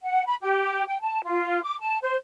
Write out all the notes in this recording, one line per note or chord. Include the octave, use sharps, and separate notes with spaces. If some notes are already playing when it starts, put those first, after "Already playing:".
F#5
B5
G4
G5
A5
F4
D6
A5
C5